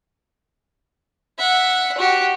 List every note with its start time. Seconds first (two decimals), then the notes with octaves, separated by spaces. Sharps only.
1.38 E5 F#5
1.98 F#4 G4